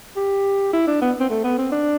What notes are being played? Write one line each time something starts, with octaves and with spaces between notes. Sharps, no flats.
G4
E4
D4
B3
C4
A3
B3
C4
D4